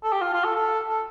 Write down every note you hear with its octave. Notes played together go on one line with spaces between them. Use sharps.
A4
G4
F4
F4
A4
A4
A4